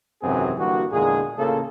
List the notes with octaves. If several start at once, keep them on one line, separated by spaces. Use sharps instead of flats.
G#1 F#2 C3 E3 C4 G#4
D3 E3 G3 A#3 F#4
E2 A#2 D3 G#3 G#4
A1 C#3 A#3 F4 A4